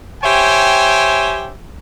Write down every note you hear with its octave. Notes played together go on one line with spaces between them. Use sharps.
G4 C5 C#5 E5 G5 G#5